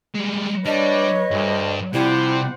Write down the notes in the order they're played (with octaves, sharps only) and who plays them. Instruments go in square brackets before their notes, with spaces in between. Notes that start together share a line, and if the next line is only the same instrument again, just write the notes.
[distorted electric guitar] G3 G#3
[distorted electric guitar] G3 [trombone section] D4 [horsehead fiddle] B4 C#5 [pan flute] D#5
[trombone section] D2 [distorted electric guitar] G2
[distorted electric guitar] C3 [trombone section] F3 G3 [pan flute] E4 [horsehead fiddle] C5 F#5